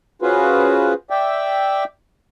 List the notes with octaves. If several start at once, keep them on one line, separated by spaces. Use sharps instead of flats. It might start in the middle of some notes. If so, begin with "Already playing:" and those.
C#4 F4 F#4 G#4 B4 C5
D5 E5 G5